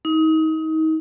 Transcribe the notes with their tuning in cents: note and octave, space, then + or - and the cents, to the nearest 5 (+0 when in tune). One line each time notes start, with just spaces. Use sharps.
D#4 +30